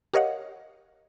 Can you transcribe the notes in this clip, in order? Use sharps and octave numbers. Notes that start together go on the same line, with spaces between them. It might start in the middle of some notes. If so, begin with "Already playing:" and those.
G4 A#4 C#5 D#5 F5 F#5